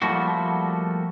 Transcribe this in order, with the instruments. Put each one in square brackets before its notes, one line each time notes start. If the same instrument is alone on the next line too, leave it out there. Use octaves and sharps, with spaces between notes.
[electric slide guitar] F3 G3 A3 A#3 F#4